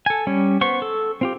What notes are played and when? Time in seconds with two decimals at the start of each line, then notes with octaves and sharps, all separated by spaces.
0.06 A4 G#5
0.27 G3 C#4
0.61 B3 C5 C#6
0.82 A4
1.21 C4 F4 G4